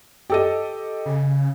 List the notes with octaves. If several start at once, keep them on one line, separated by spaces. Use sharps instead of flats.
G4 A4 D#5
C#3